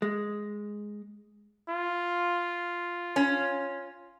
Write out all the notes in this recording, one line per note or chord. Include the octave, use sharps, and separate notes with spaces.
G#3
F4
C#4